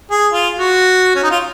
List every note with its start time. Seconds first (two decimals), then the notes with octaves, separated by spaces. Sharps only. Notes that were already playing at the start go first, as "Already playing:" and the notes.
0.10 G#4
0.33 F4
0.56 F#4
1.16 C#4
1.23 D#4
1.31 F4